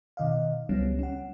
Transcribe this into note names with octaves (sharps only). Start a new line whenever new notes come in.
B2 D#3 D#5 F5
C#2 F#3 G3 B3 C#4
C#4 F#5